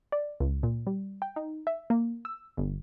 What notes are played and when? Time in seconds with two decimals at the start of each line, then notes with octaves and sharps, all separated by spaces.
0.12 D5
0.40 C#2
0.63 A#2
0.87 G3
1.22 G5
1.36 D#4
1.67 E5
1.90 A#3
2.25 E6
2.57 G1